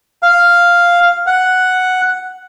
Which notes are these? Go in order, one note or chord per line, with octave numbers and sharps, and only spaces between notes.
F5
F#5